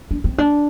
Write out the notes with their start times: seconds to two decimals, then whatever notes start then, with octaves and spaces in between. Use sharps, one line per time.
0.11 D4
0.24 C4
0.38 D4